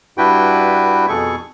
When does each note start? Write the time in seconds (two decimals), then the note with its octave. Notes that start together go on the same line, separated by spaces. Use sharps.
0.18 G2 D4 E4 F#4 B4 G5
1.09 F2 B2 G#4 A4 C#6